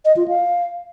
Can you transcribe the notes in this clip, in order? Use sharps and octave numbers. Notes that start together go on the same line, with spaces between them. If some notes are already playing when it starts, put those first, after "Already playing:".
D#5
F4
F5